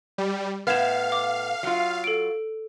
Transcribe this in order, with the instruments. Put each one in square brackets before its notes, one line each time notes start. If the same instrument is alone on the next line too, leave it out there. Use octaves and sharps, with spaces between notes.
[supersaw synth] G3
[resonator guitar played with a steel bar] A2 B3 [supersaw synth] F5 [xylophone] F6 G#6 E7
[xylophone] D6
[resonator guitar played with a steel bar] F#3 F4
[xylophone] A4 D7